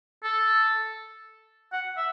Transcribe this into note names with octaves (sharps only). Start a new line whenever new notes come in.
A4
F#5
E5